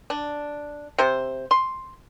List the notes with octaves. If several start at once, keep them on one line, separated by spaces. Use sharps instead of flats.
D4
C3 C5
C6